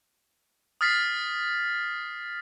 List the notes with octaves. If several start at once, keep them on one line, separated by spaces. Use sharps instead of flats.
D#6 F6 A6 B6 C7